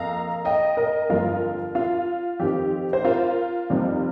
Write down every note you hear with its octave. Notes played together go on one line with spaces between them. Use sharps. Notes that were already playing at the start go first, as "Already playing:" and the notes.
Already playing: F2 A#3 F5 A#5
D#5 G5
A#4 D#5
G1 F2 F3 F4 A#4
F4
F2 D#3 C4 D#4 G4
C5
F4 A#4
F2 C3 G3 C4 D#4